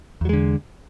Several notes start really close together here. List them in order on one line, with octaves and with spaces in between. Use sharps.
E2 F#3 G#3 D3